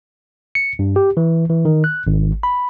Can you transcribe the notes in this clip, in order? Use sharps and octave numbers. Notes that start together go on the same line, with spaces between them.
C#7
G2
G4
E3
E3
D#3
F#6
G#1
B5